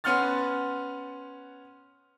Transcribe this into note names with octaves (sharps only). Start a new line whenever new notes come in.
B3 C#4 F#5 C6 F6 A6